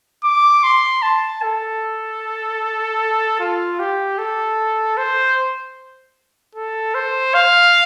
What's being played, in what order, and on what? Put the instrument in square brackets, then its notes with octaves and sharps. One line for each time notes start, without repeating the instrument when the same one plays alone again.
[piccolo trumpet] D6
C6
A5
A4
F4
G4
A4
C5
A4
C5
F5